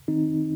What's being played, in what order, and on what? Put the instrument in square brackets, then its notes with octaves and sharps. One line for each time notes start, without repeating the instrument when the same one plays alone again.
[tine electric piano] D#3 C4 D#4